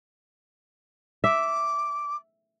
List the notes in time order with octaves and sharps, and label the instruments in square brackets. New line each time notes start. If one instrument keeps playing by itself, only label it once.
[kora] E5 [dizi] D6